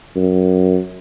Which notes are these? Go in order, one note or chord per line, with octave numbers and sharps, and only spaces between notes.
F#2